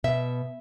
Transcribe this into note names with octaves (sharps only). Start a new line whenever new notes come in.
B2 E5